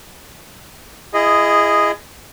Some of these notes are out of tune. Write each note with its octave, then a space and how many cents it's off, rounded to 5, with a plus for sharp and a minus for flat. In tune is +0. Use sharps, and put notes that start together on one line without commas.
E4 +30 G#4 -10 D#5 -5